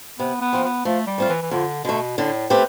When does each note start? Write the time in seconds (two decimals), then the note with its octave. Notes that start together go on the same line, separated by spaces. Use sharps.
0.19 C3 B3
0.41 B3
0.53 F3 C4
0.64 B3
0.85 F3 A3
1.07 G3
1.18 A3 C4 F4
1.29 E3
1.42 E3
1.51 F2 D3
1.84 B2 D3 A3
2.17 A2 D3
2.50 A3 C4 G4 B4